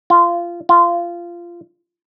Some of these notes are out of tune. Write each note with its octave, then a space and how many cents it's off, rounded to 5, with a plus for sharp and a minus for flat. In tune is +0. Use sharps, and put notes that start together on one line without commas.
F4 -15
F4 -15